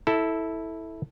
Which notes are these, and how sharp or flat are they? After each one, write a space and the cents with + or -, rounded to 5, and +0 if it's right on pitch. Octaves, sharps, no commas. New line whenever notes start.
E4 -15 A4 +0